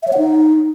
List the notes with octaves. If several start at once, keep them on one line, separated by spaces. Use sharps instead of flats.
E5
C#5
F#5
D#4